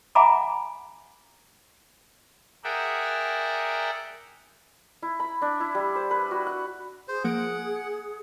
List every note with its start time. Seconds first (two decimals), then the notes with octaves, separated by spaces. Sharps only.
0.15 E5 F#5 G#5 A#5 B5 D6
2.64 G#4 A#4 D5 E5 F#5 G5
5.02 E4
5.20 B5
5.42 D4
5.60 E4
5.75 G3
5.95 C5
6.11 B4
6.31 F#4
6.47 F#5
7.08 G#4 C5
7.24 F3 A#3 F#5 D7